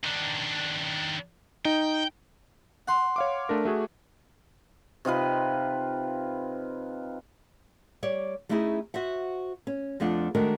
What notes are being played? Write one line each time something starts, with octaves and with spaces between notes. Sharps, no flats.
D#3 D4
D#4 G5
F#5 C6
C#5 F5 D6
A3 D4 A#4
A3 F#4 G#4
C3 D#4 F4 B4
G3 C#5 D5
G3 A3 C#4 D#4 E4 G#4
F#4 C5 E5 F#5
C#4
F2 F3 A3 D4 F#5
D#3 G#3 A3 D4 F#4 A#4